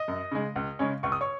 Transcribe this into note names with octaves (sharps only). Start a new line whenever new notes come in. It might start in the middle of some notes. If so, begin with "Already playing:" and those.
Already playing: D#5 D#6
F#2
C#3 G#3
C#2
C#3 G#3 C#4
C#2 C#6
D#6
C#5 C#6